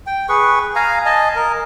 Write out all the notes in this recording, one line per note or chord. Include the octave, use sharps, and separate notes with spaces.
G5
G#4 B4 C#6
F5 G#5 A#5
D#5 G#5 A5
A#4